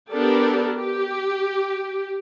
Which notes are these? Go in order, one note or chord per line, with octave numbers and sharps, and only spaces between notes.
B3 D4 G4 A4 A#4
G4